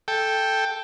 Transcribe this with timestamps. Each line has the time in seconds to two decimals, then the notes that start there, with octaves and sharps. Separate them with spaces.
0.08 A4 G5